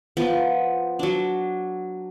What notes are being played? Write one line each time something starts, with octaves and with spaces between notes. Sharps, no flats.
F3 B3
F#3 D4